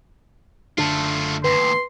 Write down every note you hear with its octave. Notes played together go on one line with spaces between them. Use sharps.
F#1 D3 A3 D4 F4
D#2 A2 B4 C6